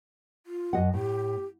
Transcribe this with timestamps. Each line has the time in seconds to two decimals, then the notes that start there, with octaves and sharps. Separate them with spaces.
0.46 F4
0.73 F#2 D#5 F#5
0.94 A2 G4